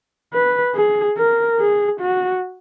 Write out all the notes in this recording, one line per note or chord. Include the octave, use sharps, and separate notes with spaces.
B4
G#4
A#4
G#4
F#4